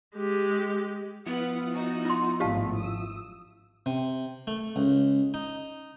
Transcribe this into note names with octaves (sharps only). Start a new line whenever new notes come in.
G#3 G4
F3 B3 E4 F4 B4 F#5
D#4 F#4
F4 C6
G#1 F#2 A2 G4 F5 A5
D#6 E6
C3
A3
C#2
D#4